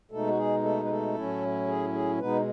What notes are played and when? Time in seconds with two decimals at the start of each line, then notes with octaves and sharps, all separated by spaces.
0.11 B2 G#3 A3 D#4 A4
0.27 F#4
0.37 G#4
0.63 A3 A4
0.84 B4
0.89 A3 A4
1.15 A2 F#3 C#4 E4
1.67 G#4
1.93 G#4
2.19 B2 G#3 B3 D#4 B4